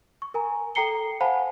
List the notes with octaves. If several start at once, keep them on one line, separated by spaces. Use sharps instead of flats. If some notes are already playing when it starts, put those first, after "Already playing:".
C#6
A#4 G#5 A#5
A4 G5 A#5 C7 C#7 G7
C5 F5 F#5 G#5 A5 B5